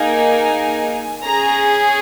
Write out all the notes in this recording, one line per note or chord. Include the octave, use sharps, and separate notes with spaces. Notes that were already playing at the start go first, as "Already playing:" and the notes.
Already playing: A#3 D#4 G#4 G#5
C#4 G#4 A#5